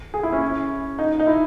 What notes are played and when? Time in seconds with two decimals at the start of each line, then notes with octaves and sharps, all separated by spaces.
0.14 G#4
0.23 E4
0.32 C#4
0.99 D#4
1.20 D#4
1.27 E4